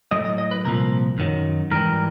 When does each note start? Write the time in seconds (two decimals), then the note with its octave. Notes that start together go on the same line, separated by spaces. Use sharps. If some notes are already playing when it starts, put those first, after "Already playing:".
0.11 A2 F#3 D#5
0.25 D#5
0.38 D#5
0.51 B4
0.65 C2 A#2 F3 A#4
1.18 F#2 D#3 F#3
1.71 G#2 E3 G3 A#4